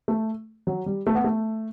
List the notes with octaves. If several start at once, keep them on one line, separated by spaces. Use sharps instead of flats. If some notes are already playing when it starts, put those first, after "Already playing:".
A3
F#3
G3
A3
B3
A3